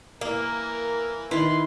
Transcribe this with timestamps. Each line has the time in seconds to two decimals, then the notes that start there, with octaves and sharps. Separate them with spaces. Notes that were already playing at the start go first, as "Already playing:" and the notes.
0.21 E3 A#3 A#4
1.31 D#3 E4 B4 C6